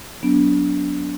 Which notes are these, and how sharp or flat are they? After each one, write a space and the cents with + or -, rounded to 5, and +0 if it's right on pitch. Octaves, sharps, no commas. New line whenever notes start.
F#3 +0 B3 +0 D4 -25